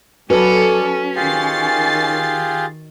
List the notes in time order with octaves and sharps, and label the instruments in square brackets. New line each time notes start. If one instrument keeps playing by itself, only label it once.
[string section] F#3 A4 [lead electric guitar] C#4 [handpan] F#4 B4 [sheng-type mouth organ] D5
[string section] D#3 A6 C7 [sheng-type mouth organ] F4 G4 G#4